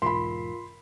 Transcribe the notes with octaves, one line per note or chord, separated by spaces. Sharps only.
B1 E2 G#2 F4 A#4 B5 C6